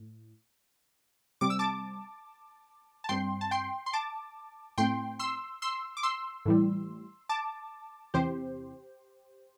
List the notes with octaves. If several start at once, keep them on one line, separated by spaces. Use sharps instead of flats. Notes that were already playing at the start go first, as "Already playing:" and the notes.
Already playing: A2
C3 G3 C4 D6
E6
A5 D6
A5
G2 G3 C4 G5 C6
A5
G5 C6
C6
A5 D6
A2 A3 C4 G5 C6
C6 E6
C6 E6
D6
C6 E6
A2 E3 G3
A5 D6
E2 C3 E3 C4 G4 C5